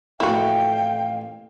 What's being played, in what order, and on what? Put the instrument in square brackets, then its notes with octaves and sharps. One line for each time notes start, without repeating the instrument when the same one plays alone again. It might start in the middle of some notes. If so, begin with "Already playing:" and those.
[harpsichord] A1 F2 A#3 [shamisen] E4 F#4 [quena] F5 [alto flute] G5